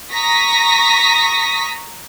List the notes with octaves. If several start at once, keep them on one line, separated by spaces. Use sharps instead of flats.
A#5 C#6 D#6 A#6 B6